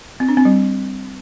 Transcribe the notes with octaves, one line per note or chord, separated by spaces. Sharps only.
C4
D4
C4
G3